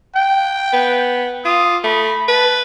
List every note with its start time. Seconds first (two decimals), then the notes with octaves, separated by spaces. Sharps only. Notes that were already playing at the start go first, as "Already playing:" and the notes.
0.15 G5
0.73 B3
1.45 F4 D#6
1.84 A3 B5
2.28 B4 A5